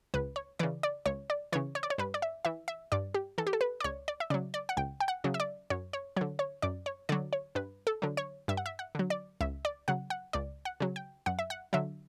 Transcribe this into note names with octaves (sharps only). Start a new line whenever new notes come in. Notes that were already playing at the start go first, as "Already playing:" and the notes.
C#2 B4
C#5
C#3 E3 D5
D5
C#2 C#5
D5
C#3 E3 C#5
C#5
D5
C#5
G2 B4
D5
E5
E3 E5
E5
G2 D5
G4
E3 A4
G4
A4
B4
D5
C#2 C#5
D5
E5
C#3 F#3 D5
D5
F#5
C#2 G5
G5
F#5
C#3 F#3
E5
D5
F#2 C#5
C#5
D3 F#3 C#5
C#5
F#2 D5
C#5
D3 F#3 D5
C#5
G2 B4
A4
D3 F#3
C#5
G2 E5
F#5
E5
F#5
D3 F#3
D5
C#2 E5
D5
C#3 F#3 F#5
F#5
C#2 D5
F#5
C#3 F#3
G5
F#2 F#5
E5
F#5
D3 F#3 E5